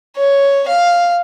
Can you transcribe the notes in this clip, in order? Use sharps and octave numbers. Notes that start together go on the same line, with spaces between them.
C#5
F5